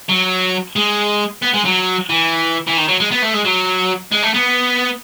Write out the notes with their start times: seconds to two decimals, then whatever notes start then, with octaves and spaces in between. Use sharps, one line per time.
0.09 F#3
0.76 G#3
1.42 B3
1.54 G#3
1.66 F#3
2.10 E3
2.67 E3
2.77 D#3
2.88 F#3
3.00 G#3
3.11 B3
3.22 A3
3.33 G#3
3.45 F#3
4.12 G#3
4.23 A3
4.34 B3